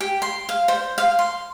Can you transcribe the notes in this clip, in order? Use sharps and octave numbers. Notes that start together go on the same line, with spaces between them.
G4
C6
F5
C5
F5
C6